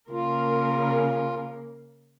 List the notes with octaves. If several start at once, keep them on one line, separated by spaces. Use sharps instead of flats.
C#3 A#3 F4 A#4